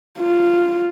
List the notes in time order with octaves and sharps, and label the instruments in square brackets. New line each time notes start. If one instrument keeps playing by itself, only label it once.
[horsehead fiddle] F4